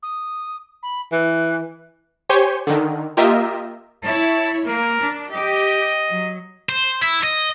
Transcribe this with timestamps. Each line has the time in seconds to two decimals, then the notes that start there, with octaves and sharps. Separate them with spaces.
0.02 D#6
0.82 B5
1.12 E3 F#6
2.29 G4 C5 C#5 G#5 C#6 G6
2.67 D3 D#3
3.17 A#3 F4 G4 A#4 D#5 E5
4.05 E4 C#5 A5
4.67 A#3 A#4
5.00 D4
5.32 G4 D#5
6.09 F#3
6.69 C5
7.02 E4
7.24 D#5